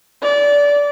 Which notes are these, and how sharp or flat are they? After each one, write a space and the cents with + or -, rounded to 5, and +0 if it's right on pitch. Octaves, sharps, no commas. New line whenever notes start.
D5 -20